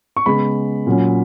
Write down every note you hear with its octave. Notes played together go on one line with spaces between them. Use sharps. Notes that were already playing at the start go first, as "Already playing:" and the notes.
C#6
C#3 G#3 B3 B5
A#2 F#3 C#4